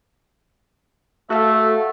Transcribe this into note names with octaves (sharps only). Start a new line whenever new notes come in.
A3 F#4 A4 E5 F5